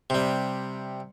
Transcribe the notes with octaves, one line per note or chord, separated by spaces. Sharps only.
C3 G3